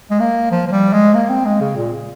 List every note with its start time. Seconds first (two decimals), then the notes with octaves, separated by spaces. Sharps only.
0.10 G#3
0.20 A#3
0.52 F3
0.67 F3
0.72 G3
0.93 G#3
1.14 A#3
1.30 C4
1.46 G#3
1.61 C#3
1.76 A#2